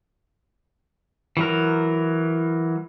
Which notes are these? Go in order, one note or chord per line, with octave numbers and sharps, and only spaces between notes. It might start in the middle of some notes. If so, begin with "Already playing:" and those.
E3 F#3 A#4